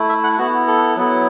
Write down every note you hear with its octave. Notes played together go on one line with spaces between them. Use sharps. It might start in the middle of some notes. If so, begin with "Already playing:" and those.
Already playing: A3 E4
E5
F#5
B3 E4 F#4
A4
F#3 B3 E4